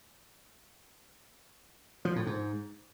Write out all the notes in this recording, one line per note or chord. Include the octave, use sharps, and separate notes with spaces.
F3
A2
G#2